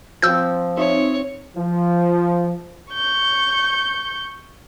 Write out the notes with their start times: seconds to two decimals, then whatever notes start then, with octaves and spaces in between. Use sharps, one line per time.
0.22 F3 C4 E6 G6
0.77 C4 D#4 C#5 E5
1.56 F3
2.93 C#6 G6